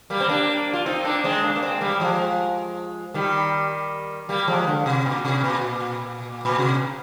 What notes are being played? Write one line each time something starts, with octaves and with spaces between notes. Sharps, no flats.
G3 A#3
C4
A#3 D4
F4
C4 D#4
A#3 D4
G#3 C4
A#3 D4
A#3
G#3 C4
G3 A#3
F3 G#3
D#3 G3
G3 A#3
F3 G#3
D3
C3
A#2
C3
A#2
A#2
C3